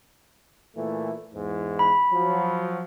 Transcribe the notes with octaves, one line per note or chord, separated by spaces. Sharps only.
A#2 E3 A3
E2 G#2 E3
B5
F3 F#3